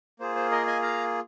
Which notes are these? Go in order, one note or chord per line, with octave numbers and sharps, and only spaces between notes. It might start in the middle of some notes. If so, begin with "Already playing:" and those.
A#3 F4 G#4 C5
C5
A#4 D#5
D#5 G#5
F5 A#5